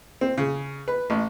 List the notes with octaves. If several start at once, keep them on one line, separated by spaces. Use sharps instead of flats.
C4
C#3
B4
A1